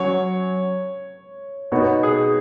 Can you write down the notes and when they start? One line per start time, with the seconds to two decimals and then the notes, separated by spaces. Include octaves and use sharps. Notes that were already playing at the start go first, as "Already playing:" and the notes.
Already playing: F#3 C#4 F#4 C#5
1.72 B2 B3 D#4 F#4 C#5
2.03 G#4